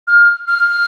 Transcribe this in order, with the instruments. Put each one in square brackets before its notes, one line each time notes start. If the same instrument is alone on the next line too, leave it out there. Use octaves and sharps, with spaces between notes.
[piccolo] F6
F6